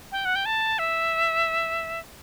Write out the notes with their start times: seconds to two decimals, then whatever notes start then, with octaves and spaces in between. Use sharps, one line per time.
0.12 G5
0.25 F#5
0.35 G5
0.46 A5
0.79 E5